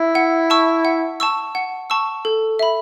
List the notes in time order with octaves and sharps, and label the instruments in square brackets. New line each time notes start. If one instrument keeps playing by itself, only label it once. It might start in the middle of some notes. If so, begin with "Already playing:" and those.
Already playing: [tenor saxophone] E4
[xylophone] F#5
A5 C#6 E6
F#5
A5 C#6 E6
F#5
A5 C#6 E6
A4
E5 B5